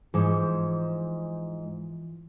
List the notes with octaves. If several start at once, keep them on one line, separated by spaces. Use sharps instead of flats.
G#2 E3 F3